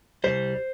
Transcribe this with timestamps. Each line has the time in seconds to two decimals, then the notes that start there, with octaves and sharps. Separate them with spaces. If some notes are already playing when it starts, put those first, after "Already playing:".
0.24 C2 B2 G3 C5